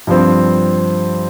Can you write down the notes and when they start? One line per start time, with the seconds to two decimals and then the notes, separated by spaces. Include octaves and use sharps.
0.07 G2 F3 C4